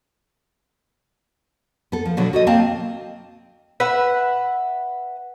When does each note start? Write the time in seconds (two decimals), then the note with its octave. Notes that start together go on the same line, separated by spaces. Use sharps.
1.92 B3 A4
2.05 F3
2.17 B2 D3 F#3
2.33 F#4 A4 D#5
2.47 A#3 C4 F5 A5
3.80 B4 E5 F#5